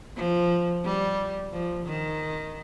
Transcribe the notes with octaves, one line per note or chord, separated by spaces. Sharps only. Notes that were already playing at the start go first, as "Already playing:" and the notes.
F3
G3
F3
D#3